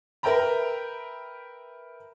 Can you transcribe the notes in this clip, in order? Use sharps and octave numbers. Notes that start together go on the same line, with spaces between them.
A#4 B4 E5 G5 A#5 B5